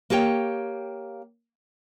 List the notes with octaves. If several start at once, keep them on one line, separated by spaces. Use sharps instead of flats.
A#3 G4 C#5 G5